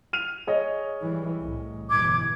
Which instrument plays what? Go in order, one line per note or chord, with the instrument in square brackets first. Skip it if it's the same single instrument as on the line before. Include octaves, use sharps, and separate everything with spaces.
[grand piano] F6 D#7 F7
G#4 C#5 D#5
[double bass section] E3 G3
C2 A2
[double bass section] G1 B2 E3 [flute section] D6 G#6